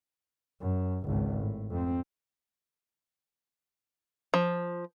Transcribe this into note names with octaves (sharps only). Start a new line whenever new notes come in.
F#2
G#1 C#2
A2
F2 C4
F3